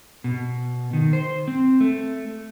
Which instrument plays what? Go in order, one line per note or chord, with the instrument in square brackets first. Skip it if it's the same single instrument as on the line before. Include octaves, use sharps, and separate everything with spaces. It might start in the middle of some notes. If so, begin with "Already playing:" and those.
[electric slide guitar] B2
D#3
C5
C4
A3